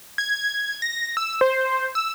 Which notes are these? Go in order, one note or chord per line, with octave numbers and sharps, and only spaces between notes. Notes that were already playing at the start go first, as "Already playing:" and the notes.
G#6
A#6
E6
C5
E6